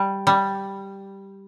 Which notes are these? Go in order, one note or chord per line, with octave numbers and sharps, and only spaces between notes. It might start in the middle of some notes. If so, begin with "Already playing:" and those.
Already playing: G3
G3